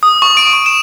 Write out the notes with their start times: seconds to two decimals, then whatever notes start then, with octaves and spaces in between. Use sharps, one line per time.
0.03 D#6
0.22 C#6
0.37 D7
0.53 C#6
0.66 E7